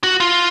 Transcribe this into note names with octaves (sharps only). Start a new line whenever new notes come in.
F#4
F4